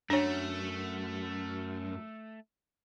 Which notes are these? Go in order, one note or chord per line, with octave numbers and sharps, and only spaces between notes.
F#2 A3 D4 C#5